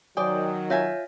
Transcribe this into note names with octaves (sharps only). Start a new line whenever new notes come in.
D#3 F#3 C5 D5 G5 G#5 D#6
F4 C#5 E5 G#5 G6 A#6